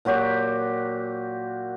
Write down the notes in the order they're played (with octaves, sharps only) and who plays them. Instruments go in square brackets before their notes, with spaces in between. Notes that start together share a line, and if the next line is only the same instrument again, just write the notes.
[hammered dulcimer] A#2 F#3 F#4 G4